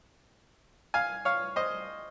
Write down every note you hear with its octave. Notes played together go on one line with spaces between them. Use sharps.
F5 G#5
C#5 F5
C5 D#5